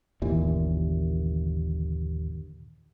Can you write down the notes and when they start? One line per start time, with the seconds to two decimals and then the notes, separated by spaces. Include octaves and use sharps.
0.22 G1 D#2 A#2 E3